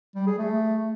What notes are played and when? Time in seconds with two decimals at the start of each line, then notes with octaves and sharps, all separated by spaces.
0.15 G3
0.27 G#4
0.38 A3